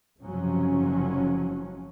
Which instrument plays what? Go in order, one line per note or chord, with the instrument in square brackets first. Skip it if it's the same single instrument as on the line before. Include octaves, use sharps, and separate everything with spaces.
[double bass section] F#1 G#2 C3 F3 F#3 C#4